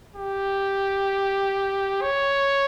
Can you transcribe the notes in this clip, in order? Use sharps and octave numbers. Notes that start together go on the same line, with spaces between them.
G4
C#5